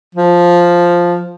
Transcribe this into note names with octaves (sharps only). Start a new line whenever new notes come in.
F3